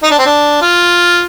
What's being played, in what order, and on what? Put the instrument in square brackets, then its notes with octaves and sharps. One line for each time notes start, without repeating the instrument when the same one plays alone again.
[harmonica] D#4
D4
C4
D4
F4